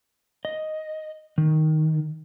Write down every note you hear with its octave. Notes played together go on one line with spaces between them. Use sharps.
D#5
D#3